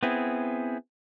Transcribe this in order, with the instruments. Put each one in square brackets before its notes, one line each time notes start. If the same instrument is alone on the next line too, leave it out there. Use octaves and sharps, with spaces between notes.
[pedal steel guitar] B3 C4 E4 G#4